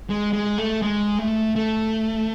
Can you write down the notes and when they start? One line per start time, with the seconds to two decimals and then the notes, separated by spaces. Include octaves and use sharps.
0.10 G#3
0.33 G#3
0.58 A3
0.82 G#3
1.19 A3
1.56 A3